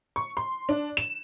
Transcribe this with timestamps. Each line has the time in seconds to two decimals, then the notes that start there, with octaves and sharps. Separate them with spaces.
0.16 C#6
0.37 C6
0.69 D4
0.97 E7